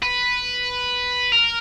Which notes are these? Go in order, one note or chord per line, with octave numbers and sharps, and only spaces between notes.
B4
A#4